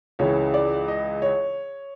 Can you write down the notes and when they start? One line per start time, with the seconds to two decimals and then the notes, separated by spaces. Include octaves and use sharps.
0.19 C#2 C#3 E3 C#5
0.54 D5
0.88 D#5
1.22 C#5